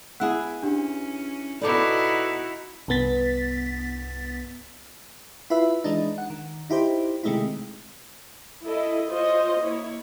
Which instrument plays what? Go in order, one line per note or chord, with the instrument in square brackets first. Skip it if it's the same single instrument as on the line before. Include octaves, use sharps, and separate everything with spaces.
[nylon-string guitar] B3 E4 G#4 [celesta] F#5 E6 F#6
[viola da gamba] C#4 [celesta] D4 G4
[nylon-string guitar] B2 A4 B4 [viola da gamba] D#4 E4 F#4 [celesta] D5 D6
[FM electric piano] C2 G2 B3 A6 B6
E4 F4 B4 E5
E3 G#3 D4 D#4
F#5
D#3
D#4 E4 G4 C5
C3 D#3 G#3 A3 D#4 E4
[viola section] E4 A4 D#5
F4 C5 C#5 D#5
A#3 E4 C#5